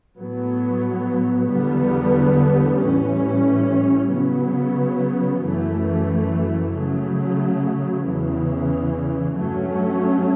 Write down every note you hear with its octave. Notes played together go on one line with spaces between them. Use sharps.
A2 F#3 B3
E2 D3 G3 B3
A2 E3 G3 C#4
C#3 F#3 B3
F#2 E3 A3
C#3 F#3 A3
E2 C#3 E3
G2 F#3 A3 C#4